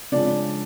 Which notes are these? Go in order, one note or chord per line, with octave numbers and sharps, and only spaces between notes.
C#3 F3 G#3 D4 D5